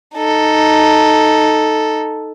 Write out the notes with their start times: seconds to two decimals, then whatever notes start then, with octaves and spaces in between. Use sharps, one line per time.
0.16 D#4 A4